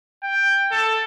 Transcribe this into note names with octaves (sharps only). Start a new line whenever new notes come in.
G5
A4